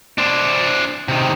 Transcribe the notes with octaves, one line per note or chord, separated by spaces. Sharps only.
D4 C5
C3 D#3